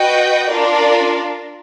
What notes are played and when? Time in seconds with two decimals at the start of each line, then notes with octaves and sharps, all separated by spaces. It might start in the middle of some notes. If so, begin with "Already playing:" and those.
Already playing: F#4 B4 D#5 G5
0.48 D4 F4 A#4 D5